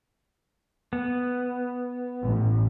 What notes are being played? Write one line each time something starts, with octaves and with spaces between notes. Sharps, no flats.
B3
A1